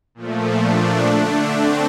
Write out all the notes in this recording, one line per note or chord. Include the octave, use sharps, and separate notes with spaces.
A#2 F3 A3
D4
D3 A3
C4